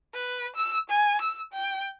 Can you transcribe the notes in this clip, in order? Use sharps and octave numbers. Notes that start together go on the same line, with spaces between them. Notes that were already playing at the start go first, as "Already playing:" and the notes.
B4
E6
G#5
E6
G5